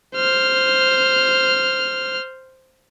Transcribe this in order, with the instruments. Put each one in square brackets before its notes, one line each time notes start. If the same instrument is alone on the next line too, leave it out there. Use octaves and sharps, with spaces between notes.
[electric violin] C5 F6